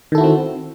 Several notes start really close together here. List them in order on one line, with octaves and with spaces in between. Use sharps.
D#3 A4 E4 F#4 C4